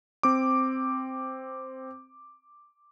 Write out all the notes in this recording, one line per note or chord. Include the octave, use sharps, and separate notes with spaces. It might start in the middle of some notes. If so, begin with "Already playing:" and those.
C4 D6